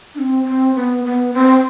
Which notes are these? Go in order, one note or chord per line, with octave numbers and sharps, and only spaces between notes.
D4
C4
C4
B3
B3
C4